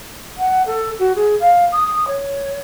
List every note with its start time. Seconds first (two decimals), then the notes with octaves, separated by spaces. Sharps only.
0.38 F#5
0.66 A4
0.99 F#4
1.15 G#4
1.40 F5
1.72 D#6
2.08 C#5